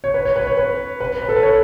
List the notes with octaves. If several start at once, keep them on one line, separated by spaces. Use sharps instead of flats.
C#5
B4
C#5
B4
C#5
B4
B4
B4
A4
B4
C#5